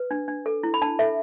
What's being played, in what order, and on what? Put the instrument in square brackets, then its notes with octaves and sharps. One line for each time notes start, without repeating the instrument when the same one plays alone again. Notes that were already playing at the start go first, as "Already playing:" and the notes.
Already playing: [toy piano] B4
D4
D4
A4
E4
B5
D4 A5
A4 E5